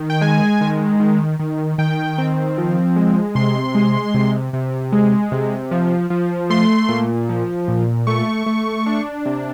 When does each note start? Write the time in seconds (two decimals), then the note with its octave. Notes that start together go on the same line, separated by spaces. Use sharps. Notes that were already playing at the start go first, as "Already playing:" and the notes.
Already playing: D#3
0.10 G5
0.21 G#3 G#5
0.61 D#3
1.00 D#3
1.40 D#3
1.78 D#3 G5
2.18 C4
2.58 F3
2.96 G#3
3.35 C3 C6
3.75 G#3
4.14 C3
4.53 C3
4.92 G#3
5.32 C3
5.71 F3
6.10 F3
6.50 A3 C6
6.89 A#2
7.29 F3
7.68 A#2
8.07 A3 C#6
8.46 A3
8.86 D4
9.26 C3